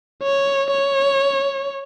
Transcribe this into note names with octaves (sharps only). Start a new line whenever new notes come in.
C#5
C#5